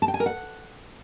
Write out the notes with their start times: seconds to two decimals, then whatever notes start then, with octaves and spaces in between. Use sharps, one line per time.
0.02 A5
0.08 G5
0.14 G#5
0.20 A#4
0.26 F#5